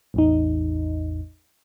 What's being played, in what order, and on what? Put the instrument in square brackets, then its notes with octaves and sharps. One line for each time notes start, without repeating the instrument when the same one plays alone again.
[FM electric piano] A1 E2 D#4